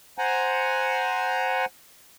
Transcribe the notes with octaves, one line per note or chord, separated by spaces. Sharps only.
C5 F#5 G#5 A#5